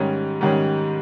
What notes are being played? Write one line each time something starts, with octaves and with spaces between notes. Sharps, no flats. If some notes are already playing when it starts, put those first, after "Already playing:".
Already playing: G#2 D#3 G3 C#4
G#2 D#3 G3 C#4